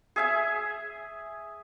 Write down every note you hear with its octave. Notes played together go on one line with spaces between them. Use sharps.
G#4 E5 G#5